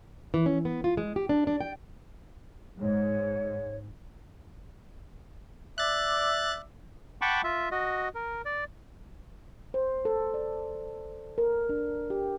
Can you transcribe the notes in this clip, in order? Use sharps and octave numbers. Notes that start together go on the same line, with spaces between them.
E3
C#4
B3
F4
G#3
G4
D4
D4
G5
G#2 C#5
D5 E5 F#6 A6
F#5 G5 A5 B5 C#6 D6
F4 E5
F#4 D#5
A#4
D5
C5
A4
D5
A#4
D4
G4